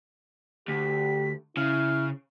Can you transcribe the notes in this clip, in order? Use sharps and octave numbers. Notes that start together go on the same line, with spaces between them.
D2 G4 B6
C#3 E4 F6